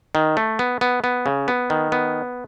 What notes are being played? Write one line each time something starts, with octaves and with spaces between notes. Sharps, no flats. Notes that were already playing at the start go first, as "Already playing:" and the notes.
D#3
A3
B3
B3
B3
C#3
B3
D#3
B3